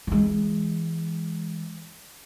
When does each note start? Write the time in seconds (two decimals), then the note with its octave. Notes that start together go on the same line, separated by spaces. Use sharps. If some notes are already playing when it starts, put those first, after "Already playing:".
0.07 E3 G#3